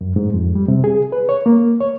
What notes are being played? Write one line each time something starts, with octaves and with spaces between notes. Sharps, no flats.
F#2
G#2
F2
G3
C3
G#4
B4
C#5
A#3
C#5